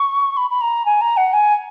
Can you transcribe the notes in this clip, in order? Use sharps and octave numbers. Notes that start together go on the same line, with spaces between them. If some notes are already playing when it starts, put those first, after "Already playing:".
Already playing: C#6
B5
B5
A#5
G#5
A#5
F#5
G#5